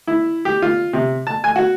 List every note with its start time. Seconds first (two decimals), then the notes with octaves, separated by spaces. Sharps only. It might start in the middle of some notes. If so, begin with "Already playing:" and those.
0.07 E4
0.45 G4
0.62 F4
0.93 C3
1.27 A5
1.44 G#5
1.56 F#4